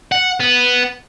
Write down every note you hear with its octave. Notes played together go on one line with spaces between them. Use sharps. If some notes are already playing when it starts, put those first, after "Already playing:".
F#5
B3